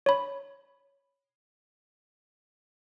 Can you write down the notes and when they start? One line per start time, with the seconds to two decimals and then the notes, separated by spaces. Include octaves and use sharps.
0.06 C#5 B5